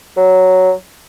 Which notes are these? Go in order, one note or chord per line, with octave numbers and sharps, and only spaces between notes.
F#3